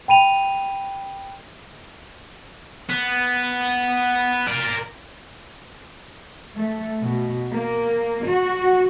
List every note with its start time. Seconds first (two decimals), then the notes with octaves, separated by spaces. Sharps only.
0.08 G5 B5 D#7 F7
2.89 B3
4.48 A#4 D5
6.56 A3
7.01 B2
7.52 A#3
8.25 F#4